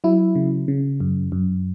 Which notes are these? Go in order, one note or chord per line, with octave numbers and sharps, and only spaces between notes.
F#3 E4
C#3
C#3
F#2
F#2